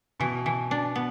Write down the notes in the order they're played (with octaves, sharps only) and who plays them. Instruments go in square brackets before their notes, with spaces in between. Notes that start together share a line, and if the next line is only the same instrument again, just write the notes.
[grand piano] B2 [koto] E3
[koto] E3
D4
B3